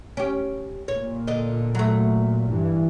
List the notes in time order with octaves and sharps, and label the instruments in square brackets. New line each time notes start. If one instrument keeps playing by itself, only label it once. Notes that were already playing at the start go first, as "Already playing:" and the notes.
[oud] C#4 G4
[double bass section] A#2 [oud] C#5
[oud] D3 D#5
F#3 A3
[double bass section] G2 E3